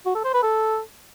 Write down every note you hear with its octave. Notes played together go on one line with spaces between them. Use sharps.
F#4
A4
C5
B4
A4